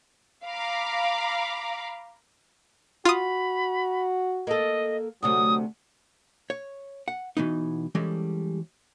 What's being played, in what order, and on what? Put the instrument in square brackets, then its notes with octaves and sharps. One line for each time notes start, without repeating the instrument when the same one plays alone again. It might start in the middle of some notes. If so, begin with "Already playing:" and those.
[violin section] F5 A#5 B5 D6
[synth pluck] F4 D#6 [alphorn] F#4 [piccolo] B5
[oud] A#3 A4 [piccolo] D#5
[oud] D2 C3 A3 [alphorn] F#3 [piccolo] D#6
[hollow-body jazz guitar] C#5
F#5
B2 E3 B3 D#4
E3 G3 G#3 C#4 A4